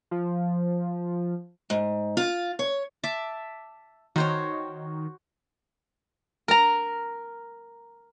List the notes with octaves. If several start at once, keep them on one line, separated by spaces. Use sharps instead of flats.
F3
G#2
F4
C#5
E5 A5 D6
D#3 F#4 C5 C#5
A#4 A#5